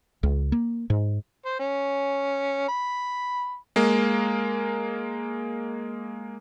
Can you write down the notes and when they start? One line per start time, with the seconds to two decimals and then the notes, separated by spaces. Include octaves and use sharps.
0.23 C#2
0.52 A#3
0.90 G#2
1.45 C5
1.59 C#4
2.68 B5
3.76 G#3 A#3